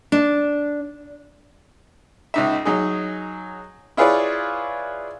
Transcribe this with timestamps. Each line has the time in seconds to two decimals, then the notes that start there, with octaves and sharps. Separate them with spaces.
0.12 D4
2.34 C#2 D#4 E5
2.65 F#3 D#4 G#4
3.97 E4 F4 G#4 B4 C#5 D5